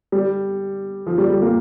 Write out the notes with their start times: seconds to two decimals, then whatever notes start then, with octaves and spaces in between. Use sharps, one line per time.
0.12 G3
1.07 F3
1.18 G3
1.30 G3
1.42 A#3